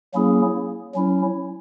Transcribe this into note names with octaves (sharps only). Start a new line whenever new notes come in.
F#3 A#3 C#4 E4 G#4
F#3 C#4 E4